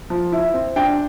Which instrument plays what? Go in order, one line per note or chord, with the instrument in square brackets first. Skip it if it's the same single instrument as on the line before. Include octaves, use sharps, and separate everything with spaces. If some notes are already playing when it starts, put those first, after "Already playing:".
[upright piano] F3
E4
C4
D4 G5